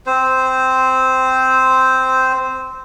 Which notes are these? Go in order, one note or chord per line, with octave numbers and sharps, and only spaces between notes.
C4 C5